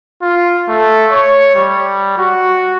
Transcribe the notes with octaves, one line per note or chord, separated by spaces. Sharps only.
F4
A3
C#5
G3
F#4